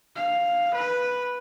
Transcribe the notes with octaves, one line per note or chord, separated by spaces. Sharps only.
F5
B4